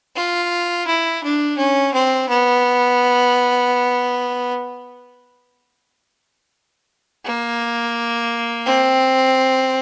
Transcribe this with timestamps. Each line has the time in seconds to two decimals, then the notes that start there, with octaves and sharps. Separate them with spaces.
0.16 F4
0.87 E4
1.23 D4
1.57 C#4
1.94 C4
2.29 B3
7.25 A#3
8.66 C4